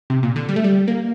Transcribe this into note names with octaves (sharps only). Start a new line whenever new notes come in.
C3
A#2
D3
G3
A3
G3
A#3